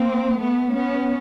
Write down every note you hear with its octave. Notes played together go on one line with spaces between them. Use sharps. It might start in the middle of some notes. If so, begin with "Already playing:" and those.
Already playing: A#3 C4
A3 B3
B3 C#4